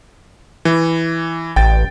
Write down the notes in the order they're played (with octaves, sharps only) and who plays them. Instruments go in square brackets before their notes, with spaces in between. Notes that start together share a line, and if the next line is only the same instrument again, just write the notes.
[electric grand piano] E3
[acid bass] A1 [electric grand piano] G5 A6